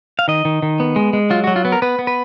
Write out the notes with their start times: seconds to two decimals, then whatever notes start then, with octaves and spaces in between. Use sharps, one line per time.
0.19 F5
0.28 D#3 D#5
0.45 D#3
0.62 D#3
0.80 B3
0.96 G#3
1.13 G#3
1.30 F#3 F4
1.44 F#3 F#4
1.56 F4
1.65 B3
1.72 A#4
1.82 B3 B4
1.99 B3
2.07 B4